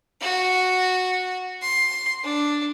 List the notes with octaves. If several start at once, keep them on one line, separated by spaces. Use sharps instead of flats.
F#4
C6
D4